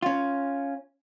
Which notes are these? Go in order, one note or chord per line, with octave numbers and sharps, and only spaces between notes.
C#4 F4